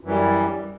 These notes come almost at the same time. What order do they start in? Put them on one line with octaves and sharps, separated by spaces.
F#2 E3 G3